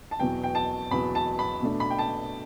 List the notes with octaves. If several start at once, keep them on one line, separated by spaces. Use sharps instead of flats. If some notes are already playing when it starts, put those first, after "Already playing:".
A5
E2 B2 F#3 B3 G5
G5
A5
E2 B2 F#3 B3 B5
A5
B5
B2 A3 D4
B5
G5
A5